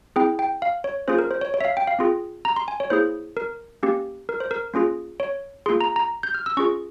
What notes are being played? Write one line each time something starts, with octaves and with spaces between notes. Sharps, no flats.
C4 E4 G#4 G5
G5
F5
C#5
A#3 C#4 F4 G#4 C5
A#4
C5
C#5
C#5
E5
F5
G5
F5
C4 F4 G#4
A#5
C6
G#5
C#5
A#3 E4 G#4 C5
A#4
A#3 C#4 G4
A#4
C5
A#4
A#3 C#4 F4 G#4
C#5
A#3 F4 G#4 C6
A#5
A#5
G6
F6
E6
C#4 F4 G#4 C#6